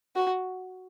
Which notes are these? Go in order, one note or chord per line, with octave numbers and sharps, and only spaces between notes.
F#4